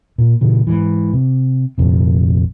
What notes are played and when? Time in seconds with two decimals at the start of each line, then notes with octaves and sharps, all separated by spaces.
0.18 A#2
0.41 A#2 C#3 E3
0.67 G#2 E3
1.13 C3
1.78 A#1 F2 C3